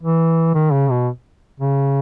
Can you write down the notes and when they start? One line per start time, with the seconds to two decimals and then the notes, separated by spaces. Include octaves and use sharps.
0.03 E3
0.55 D#3
0.72 C#3
0.90 B2
1.60 C#3